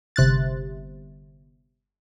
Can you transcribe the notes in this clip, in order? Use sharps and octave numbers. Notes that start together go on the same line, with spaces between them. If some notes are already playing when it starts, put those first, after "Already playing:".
G1 C3 F#6 A6